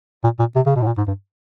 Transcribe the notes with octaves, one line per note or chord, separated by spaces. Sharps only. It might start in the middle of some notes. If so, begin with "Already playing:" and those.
A#2
A#2
C3
C#3
B2
A2
A#2
G#2
G2